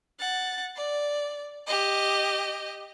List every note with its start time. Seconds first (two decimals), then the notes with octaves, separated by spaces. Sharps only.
0.20 F#5 A6
0.76 D5
1.67 G4 D#5